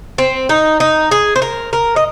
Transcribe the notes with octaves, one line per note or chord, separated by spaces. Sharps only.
C4
D#4
D#4
G#4
C5
A#4
A#4
D#5